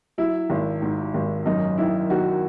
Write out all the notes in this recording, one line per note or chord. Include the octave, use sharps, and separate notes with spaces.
F#3 E4
G#1
G#2
G#1
F#2 D#4
D#3 E4
D#3 F#4